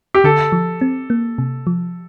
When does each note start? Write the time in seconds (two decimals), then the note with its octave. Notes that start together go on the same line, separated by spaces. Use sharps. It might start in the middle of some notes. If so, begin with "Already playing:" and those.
0.14 G4
0.24 D3 A4
0.52 F3
0.81 C4
1.10 A#3
1.38 C3
1.67 F3